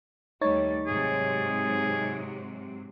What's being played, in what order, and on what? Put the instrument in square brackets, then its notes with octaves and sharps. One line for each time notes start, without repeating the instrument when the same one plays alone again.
[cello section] D#2 G3 A3 [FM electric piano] D#4 C#5 A6
[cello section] G#2 C3 F#3 [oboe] G#4